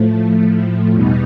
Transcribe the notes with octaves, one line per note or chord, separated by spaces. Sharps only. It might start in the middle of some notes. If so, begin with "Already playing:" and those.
Already playing: A2 F3 A3
E2 B2 G3 B3 D#4